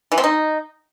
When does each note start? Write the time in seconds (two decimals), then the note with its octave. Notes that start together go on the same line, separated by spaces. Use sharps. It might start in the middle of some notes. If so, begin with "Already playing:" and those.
0.12 E3
0.18 C4
0.24 D#4